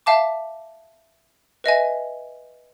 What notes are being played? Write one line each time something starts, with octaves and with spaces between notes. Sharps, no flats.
E5 F5 A5 D6
B4 D#5 E5 G#5